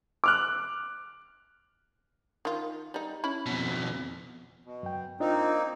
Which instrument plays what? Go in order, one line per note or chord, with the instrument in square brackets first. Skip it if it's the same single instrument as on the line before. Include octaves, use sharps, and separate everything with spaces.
[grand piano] D6 F6 F#6
[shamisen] D#3 F4
G3 D#4
C#4 E4 B5
[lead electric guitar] F2 B2
[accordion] B2
[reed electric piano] F#2 G5
[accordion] A#3 C4 D#4 [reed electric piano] D4 F4 D#5